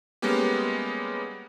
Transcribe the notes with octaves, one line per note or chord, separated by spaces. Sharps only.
G3 G#3 A#3 B3 C#4 G4